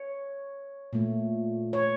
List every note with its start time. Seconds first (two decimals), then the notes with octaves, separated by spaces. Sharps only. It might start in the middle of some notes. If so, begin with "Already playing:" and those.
Already playing: C#5
0.93 A#2 A3
1.73 C#5